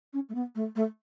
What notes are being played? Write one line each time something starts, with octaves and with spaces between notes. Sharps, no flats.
C#4
A3
B3
A3
A3